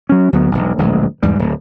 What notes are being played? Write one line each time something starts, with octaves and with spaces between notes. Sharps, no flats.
F#3 C#4
D2 F#3 B3
E1 B1
D1 A#1 G#3
E2 G#2 G3
D1